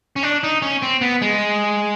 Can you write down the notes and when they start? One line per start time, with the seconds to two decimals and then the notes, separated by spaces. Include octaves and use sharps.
0.16 C#4
0.23 D4
0.44 D#4
0.62 C#4
0.82 C4
1.01 B3
1.22 G#3